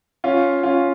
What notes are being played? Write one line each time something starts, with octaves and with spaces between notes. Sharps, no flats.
C#4 F4
C#4 F4